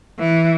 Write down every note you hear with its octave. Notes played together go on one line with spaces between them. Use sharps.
E3